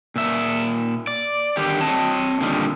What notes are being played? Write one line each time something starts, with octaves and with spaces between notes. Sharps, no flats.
A#2 E5
D5
D3 D#3 G4
C4 C#5 D#5 A5
A#2 D3 D#3 G3